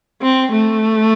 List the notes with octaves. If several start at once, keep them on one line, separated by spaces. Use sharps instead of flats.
C4
A3